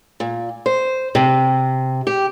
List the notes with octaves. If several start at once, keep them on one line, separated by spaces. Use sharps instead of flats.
A#2
C5
C3
G4